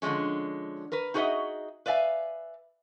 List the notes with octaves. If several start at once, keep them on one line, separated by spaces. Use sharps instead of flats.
D3 F3 G3 G#3 C#4
A#4 B4
D#4 F#4 G#4 B4 D#5 E5
B4 D5 E5 F5 G#5